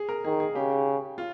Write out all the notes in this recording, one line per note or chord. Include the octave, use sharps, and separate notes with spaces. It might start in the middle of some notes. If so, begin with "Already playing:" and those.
Already playing: G#4
A#4
D#3 G#4
G#4
C#3 G4
F4